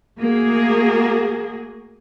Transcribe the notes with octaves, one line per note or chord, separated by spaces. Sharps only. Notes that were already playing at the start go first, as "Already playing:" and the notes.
A3 A#3 F#4 G#4